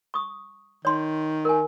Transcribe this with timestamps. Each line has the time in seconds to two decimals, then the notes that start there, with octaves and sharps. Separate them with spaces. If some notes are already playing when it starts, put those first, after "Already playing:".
0.14 C#6 D#6
0.85 D#3 C#5 C6
1.45 A#4 G#5